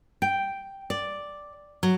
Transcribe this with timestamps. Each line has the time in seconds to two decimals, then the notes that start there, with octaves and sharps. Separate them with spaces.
0.22 G5
0.90 D5
1.83 F#3